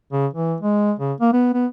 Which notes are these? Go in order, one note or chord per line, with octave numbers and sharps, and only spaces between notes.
C#3
E3
G#3
C#3
A#3
B3
B3